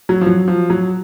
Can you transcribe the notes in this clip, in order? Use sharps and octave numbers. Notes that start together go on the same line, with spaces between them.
F#3
F3
F#3
F3
F#3